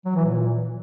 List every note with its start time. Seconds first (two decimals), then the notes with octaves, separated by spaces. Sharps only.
0.05 F#3
0.15 E3
0.25 A#2